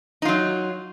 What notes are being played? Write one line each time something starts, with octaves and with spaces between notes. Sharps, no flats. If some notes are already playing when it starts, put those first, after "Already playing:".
F#3 D#4 F4